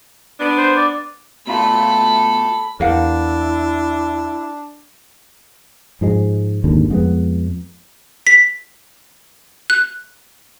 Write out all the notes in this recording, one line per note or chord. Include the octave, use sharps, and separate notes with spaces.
B3 D4
C5
D5
B2 A3 F4 A4 B5
E2 D4 E4 A#4 F5 F#5
G#2 F3 G#3
G#1 D#2 D3
F2 G#3 B3
B6
F#6